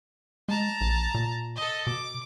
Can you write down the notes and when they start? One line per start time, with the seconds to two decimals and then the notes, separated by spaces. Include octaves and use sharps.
0.48 G#3 A5 A#5
0.81 A#1
1.14 A#2
1.56 A4 D#5
1.87 B2 D6